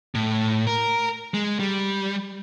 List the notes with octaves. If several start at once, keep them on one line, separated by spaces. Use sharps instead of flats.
A2
A#4
G#3
G3